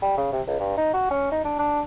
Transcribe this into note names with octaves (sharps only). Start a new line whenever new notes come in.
G3
C#3
C3
C#2
G2
D#4
F#4
C#4
D#4
D4
D4